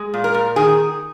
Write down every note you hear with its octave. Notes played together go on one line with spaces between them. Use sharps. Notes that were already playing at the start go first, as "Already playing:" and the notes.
Already playing: G#3
A#2
A#4
A#2
D#3 G#4